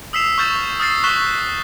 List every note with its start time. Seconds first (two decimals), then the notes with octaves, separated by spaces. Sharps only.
0.13 D#6 E6 B6 C7 E7 F7
0.38 C#6 F6 G6 A6 E7
0.80 D#6 F6 A6 C7
1.04 C#6 F#6 B6 E7 G7